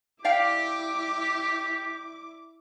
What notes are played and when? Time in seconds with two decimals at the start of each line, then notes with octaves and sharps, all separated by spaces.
0.25 E4 G4 D5 F5 G5 D6